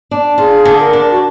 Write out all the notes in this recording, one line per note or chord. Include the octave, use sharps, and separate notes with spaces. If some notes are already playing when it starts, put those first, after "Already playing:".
D4
F4 G#4
D3
A#4
D4
F#4